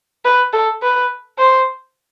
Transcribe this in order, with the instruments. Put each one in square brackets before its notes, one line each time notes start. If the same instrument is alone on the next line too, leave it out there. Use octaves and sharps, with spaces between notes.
[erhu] B4
A4
B4
C5